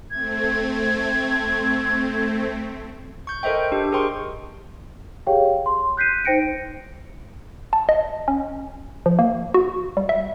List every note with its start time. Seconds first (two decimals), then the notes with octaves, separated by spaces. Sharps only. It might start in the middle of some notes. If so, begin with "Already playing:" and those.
0.11 A3 C4 G#6
3.27 C#6 G6
3.43 A4 A#4 C5 D#5 E5 G5
3.72 D4 G4
3.92 G#4 A#4 C5 G5 C6 C#6
5.27 G4 G#4 C#5 F5 G5
5.66 C6
5.97 F#6 G6 B6 C7 D#7
6.25 D#4 C5 G5 A#6 C#7 D7
7.73 A5
7.89 D#5
8.28 C#4
9.06 F3
9.19 A#3
9.54 F#4
9.97 G3
10.09 E5